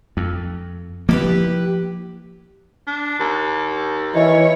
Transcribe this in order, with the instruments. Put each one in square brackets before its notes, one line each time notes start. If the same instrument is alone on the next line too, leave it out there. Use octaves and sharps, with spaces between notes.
[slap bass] F2
[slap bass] F3 A#3 [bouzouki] E4 G4 B4
[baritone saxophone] D4
D#2
[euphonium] E3 [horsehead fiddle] E4 C#5 [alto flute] D#5